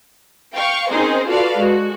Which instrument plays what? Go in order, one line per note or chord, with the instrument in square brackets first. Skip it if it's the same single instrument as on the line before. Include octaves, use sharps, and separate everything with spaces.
[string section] F5 G5 C#6
C4 C#4 D#4 G#4 A#4 C5
F4 F#4 A4 B4 D5 F5
G#3 F#4